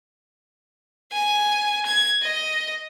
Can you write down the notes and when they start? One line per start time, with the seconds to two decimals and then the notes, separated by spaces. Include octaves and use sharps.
1.13 G#5
1.86 G#6
2.22 D#5